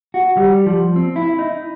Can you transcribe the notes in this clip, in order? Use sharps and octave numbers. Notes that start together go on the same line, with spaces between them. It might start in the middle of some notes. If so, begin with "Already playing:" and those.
F#4
G3
F3
C4
E4
D#4